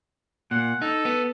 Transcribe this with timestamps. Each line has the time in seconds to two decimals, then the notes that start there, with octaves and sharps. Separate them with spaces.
0.51 A#2 F#5
0.82 D#4 A4
1.05 B3